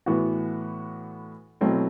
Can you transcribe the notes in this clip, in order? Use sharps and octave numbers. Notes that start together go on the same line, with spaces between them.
A2 E3 B3 F#4
B2 F#3 A3 C4 E4